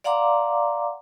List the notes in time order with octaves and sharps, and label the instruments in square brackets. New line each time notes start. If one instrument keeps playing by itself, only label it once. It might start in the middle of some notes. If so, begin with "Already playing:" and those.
[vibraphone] D5 F5 F#5 A#5 C6 D6